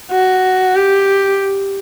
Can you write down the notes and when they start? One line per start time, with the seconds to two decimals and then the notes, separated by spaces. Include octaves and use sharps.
0.11 F#4
0.76 G4